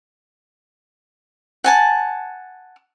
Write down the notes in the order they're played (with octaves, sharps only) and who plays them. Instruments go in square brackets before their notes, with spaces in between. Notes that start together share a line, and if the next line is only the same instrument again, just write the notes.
[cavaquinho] F#5 G#5 A5